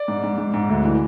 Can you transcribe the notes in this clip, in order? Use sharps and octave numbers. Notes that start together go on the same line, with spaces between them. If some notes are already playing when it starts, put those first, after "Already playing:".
Already playing: D5
G#2
G#2
G#2
G#2
D2
E3